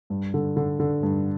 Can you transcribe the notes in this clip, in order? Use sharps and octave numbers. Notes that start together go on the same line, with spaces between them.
G2
D3
D3
D3
G2